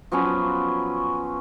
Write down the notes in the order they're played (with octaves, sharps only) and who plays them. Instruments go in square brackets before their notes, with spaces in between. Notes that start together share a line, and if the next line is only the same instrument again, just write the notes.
[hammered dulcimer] F3 F#3 B3 C#4